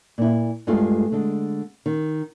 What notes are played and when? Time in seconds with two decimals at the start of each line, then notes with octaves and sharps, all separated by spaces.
0.18 A#2 E4
0.67 G2 G#3 A3 F4
1.12 D3 G#3
1.86 D#3